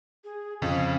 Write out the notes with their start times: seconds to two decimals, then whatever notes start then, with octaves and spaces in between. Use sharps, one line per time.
0.24 G#4
0.62 F2 C#3 F5